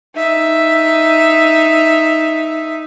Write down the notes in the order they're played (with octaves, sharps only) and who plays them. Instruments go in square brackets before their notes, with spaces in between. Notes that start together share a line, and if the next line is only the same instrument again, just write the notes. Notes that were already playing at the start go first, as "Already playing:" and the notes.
[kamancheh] D#4 E5